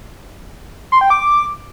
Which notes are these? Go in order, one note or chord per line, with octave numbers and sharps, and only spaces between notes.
C6
G5
D6